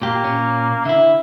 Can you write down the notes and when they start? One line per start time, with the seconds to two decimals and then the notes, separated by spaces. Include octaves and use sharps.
0.02 A#2 A#3 G4
0.24 A#2 C#4
0.85 D3 E4 E5